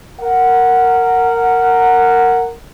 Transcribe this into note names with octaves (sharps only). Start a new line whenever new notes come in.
A#4 F#5